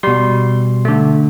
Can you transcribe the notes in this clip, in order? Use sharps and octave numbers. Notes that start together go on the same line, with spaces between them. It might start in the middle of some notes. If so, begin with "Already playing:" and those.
B2 G3 C6
D3 A3